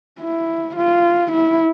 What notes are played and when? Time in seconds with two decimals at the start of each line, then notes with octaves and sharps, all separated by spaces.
0.20 E4
0.77 F4
1.32 E4